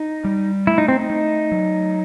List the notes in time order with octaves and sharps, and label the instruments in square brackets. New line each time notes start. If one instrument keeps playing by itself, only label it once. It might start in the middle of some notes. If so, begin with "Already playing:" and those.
Already playing: [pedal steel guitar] D#4
[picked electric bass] G3
[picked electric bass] A3 [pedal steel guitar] E4
[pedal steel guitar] D#4
C4
D#4
[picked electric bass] A3
F#3